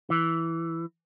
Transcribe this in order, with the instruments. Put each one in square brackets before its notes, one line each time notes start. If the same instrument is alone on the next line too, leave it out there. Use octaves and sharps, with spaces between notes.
[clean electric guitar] E3